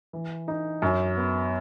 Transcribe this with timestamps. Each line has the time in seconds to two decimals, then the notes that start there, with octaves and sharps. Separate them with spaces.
0.13 E3
0.48 D#4
0.82 F#2
1.17 B3